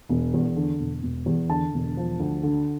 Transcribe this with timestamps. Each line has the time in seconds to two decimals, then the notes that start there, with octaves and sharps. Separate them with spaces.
0.09 E1
0.34 E2
0.56 D3
0.79 E1
1.03 E1
1.26 E2
1.50 D3 A5
1.74 E1
1.97 F3
2.20 D2
2.43 D3